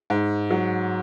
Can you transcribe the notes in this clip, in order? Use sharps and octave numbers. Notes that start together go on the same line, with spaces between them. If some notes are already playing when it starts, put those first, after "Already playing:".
G#2
F#3